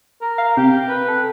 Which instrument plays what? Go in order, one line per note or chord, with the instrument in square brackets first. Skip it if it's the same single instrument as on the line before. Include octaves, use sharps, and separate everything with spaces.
[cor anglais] A#4
[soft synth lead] F5
[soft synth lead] C3 [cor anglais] G4
[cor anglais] B4
[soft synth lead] A4